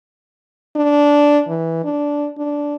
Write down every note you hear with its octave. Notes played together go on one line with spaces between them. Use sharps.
D4
E3
D4
D4